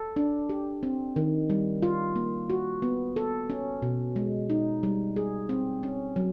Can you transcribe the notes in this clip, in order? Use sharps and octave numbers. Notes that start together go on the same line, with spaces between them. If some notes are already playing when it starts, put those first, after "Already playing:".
Already playing: A4
D4
G4
C4
D#3
G3
F4
A#3
F#4
B3
A4
C#4
B2
G#3
D#4
G3
G#4
C4
C#4
F#3